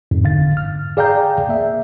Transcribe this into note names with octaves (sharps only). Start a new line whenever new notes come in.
F2 G#2
G1 D3 F5 A6
F6
G#4 D5 F5 G5 A#5 G6
A#3 E5